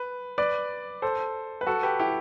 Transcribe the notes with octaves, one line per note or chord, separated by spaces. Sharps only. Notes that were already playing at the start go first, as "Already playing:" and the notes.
Already playing: B4
B4 D5
A4 C5
B4
F#4 A4
G4 B4
E4 G4